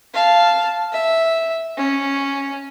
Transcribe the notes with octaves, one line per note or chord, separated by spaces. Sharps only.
F5 A5
E5
C#4